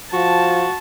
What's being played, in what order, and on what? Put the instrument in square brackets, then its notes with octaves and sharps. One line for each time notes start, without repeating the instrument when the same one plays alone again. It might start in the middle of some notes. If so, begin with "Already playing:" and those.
[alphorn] F3 [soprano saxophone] F#4 [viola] A5